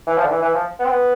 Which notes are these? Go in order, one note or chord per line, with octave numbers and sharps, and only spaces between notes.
E3
F3
D3
E3
E3
F3
B3
C4
B3